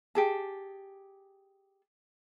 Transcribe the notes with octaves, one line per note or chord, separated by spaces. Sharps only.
G4 G#4 A5